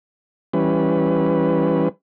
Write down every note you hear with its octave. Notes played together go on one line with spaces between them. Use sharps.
E3 G3 C#4 B4